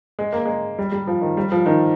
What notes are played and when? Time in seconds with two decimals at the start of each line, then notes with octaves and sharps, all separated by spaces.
0.19 G#3
0.33 A#3
0.45 G#3
0.79 G3
0.92 G3
1.07 F3
1.22 D#3
1.37 G3
1.52 F3
1.66 D#3